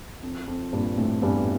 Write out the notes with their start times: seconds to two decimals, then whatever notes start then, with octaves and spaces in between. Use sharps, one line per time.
0.23 F2
0.48 F2
0.73 G2 A#2
0.97 F2 A2
1.22 E2 G2